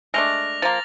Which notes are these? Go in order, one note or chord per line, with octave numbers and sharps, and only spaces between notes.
G#3 A3 D4 F6 A#6 F7
F3 A#3 A6